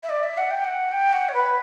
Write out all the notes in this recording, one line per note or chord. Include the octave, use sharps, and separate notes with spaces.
E5
D5
E5
F#5
G5
F#5
G5
F#5
C#5
B4